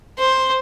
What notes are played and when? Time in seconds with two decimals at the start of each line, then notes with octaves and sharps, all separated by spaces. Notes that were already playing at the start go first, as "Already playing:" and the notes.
0.18 C5